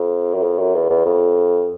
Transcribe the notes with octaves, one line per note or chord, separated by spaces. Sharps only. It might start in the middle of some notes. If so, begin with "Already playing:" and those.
Already playing: F2
F#2
F2
F#2
E2
E2
F2